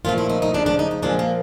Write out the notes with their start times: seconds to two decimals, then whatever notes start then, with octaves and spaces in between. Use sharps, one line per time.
0.05 A#2 F3 A3 F4
0.18 E4
0.29 D#4
0.42 D#4
0.54 C#3 F3 A3 D4
0.66 D4
0.79 D#4
0.91 D#4
1.02 A#2 F3 G#3 D4
1.19 A#3